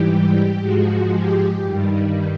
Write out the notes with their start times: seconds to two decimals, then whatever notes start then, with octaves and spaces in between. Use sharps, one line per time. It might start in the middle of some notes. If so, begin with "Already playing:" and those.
Already playing: G#2 E3 G3 G4
0.59 G#2 F3 G#3 F#4
1.11 G4
1.63 G2 D#3 G3